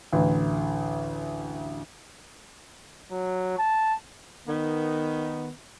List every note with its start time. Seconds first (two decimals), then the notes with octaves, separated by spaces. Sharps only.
0.13 A1 D2
3.12 F#3
3.58 A5
4.47 D#3 B3